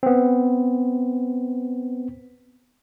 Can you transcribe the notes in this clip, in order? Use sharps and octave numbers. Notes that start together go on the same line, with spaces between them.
B3 C4